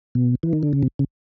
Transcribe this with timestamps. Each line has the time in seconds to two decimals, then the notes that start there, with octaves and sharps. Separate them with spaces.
0.15 B2
0.43 E3
0.53 D#3
0.63 D3
0.73 C#3
0.83 C3
0.99 C#3